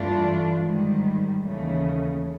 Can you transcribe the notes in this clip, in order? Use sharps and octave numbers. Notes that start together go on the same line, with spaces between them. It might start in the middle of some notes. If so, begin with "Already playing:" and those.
Already playing: G2 E3 A3 D4 F4
G#2 D#3 G3
D#2 C#3 E3 A3